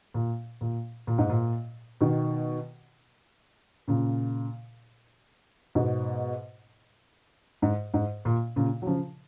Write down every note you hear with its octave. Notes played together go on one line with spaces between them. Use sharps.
A#2
A#2
A#2
G#2
A#2
B2 D#3
A#2 C#3
G#2 B2
G#2
G#2
A#2
A#2 C#3
F#3
C#3 F3